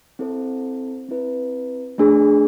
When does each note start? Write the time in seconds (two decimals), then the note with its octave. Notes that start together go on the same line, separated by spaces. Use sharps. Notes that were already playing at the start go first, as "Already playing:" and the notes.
0.19 C4 E4 A4 C5
1.09 C4 E4 B4
1.98 A3 D4 G#4